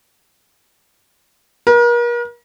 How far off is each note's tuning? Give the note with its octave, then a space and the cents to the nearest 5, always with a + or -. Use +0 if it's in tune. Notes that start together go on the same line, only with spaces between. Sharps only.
A#4 +40